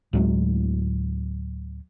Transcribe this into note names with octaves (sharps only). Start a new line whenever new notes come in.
D2 A2 F#3 G#3